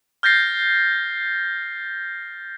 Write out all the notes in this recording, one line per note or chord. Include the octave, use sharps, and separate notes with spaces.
F6 G6 A6 A#6 C7